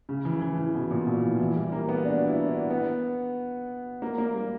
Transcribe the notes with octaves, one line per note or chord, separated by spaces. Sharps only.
C#3
E3
E3
E3
B2
A#2
B2
E3
E3
G3
A#3
B3
D4
F#4
E4
D4
B3
A#3
A#3
G3